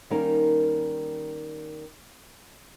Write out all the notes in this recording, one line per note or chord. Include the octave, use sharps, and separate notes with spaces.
D#3 G3 A#3 C#4 D#4 A#4